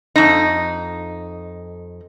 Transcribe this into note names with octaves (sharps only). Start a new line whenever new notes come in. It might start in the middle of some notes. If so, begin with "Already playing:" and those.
F2 D#4